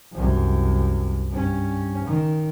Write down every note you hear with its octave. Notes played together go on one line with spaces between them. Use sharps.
C2 F#2
G2 C#4
D#3